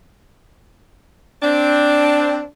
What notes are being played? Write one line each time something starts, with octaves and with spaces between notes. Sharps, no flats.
C4 D4